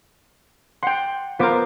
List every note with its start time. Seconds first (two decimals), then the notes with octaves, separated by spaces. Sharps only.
0.83 F#5 G5 C6
1.39 B3 F4 A#4 C5 D6